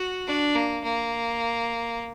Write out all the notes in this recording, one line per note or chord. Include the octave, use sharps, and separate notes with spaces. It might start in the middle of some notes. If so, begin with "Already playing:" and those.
Already playing: F#4
D4
A#3
A#3